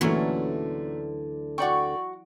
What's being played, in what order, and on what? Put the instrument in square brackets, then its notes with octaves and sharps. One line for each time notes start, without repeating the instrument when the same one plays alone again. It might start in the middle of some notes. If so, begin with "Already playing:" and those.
[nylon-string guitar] D2 D3 [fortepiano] A#2 A3 [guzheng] E3 F#3 C#4
[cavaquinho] F#4 C#6 [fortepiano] D5 G5